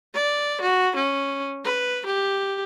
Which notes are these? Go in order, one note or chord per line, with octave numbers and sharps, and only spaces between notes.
D5
F#4
C#4
B4
G4